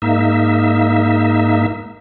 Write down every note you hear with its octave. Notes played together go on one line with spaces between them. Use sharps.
G#2 A#3 D#4 E5